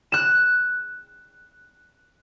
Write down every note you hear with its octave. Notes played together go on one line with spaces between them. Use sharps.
F#6 E7